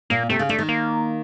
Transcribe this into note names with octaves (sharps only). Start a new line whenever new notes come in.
A#2 A#3
C3 A3
C#3
D3 A3
D#3
A#3